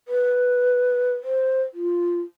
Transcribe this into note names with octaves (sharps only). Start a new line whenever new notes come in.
B4
C5
F4